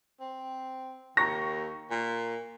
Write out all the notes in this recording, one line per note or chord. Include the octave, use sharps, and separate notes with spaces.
C4
D#2 A#5 C#6 A#6
A#2